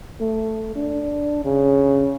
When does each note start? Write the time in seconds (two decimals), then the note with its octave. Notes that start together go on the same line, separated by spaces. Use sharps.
0.20 A3
0.76 D4
1.45 C#3